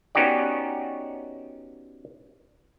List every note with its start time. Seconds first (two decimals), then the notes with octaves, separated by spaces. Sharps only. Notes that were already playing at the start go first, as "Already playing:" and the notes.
0.15 B3 C#4 D#4 F#4 G4 D5